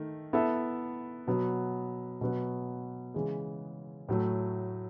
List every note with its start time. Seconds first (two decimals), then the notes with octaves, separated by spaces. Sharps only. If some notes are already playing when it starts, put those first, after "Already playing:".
Already playing: D#3 A3
0.33 B3 E4 A4 E5
1.27 B2 F#3 B3
2.21 B2 F#3 B3
3.14 C#3 E3 G#3
4.08 A2 F#3 A3